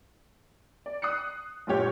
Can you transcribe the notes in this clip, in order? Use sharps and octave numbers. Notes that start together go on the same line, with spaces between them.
D5
D#6 F#6 C7 C#7
G1 D2 A#2 G4 C#5